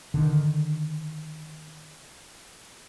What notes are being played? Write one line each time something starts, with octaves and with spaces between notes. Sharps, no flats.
D3 D#3